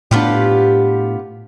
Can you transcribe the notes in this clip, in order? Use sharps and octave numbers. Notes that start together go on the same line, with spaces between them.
A2 B3 D4 F4 G4